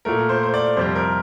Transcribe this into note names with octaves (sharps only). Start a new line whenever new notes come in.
A#2 A3 A#4
C5
C5
D5
F2 C3 G3 C5
A#4